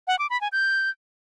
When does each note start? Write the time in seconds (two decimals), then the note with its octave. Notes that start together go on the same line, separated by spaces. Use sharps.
0.08 F#5
0.19 D6
0.30 B5
0.41 G#5
0.52 G6